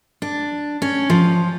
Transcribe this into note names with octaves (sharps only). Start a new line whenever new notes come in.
D4
C#4
F3